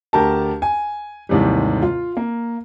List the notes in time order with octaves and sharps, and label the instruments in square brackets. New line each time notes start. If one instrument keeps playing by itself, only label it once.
[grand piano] D2 G4 A#4 A5
G#5
D#2 G#2 C3 E3 G3
F4
A#3